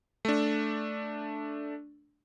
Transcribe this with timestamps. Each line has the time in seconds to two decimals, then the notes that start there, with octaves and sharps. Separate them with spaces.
0.25 A3 D4